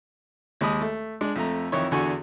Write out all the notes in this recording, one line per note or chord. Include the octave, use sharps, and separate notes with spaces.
D#2 G#3 D#5 B5 D#6
A3
G#3 D4
F2 A3 A#5
F2 D#3 E3 E4 C#5 C#6
E2 D3 F#4 G#5 C#6